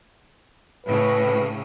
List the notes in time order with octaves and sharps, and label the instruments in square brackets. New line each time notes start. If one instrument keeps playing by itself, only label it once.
[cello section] A2 C#3 [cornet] B4